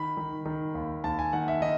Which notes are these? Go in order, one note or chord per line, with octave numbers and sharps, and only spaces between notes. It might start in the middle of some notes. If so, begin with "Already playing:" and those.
Already playing: D#3 B5
D#3
D#3
D#2
D#2 A5
G#5
D#3 F#5
E5
D#3 D#5